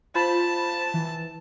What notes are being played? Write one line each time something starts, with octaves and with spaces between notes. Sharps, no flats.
F4 C5 A5 B5
E3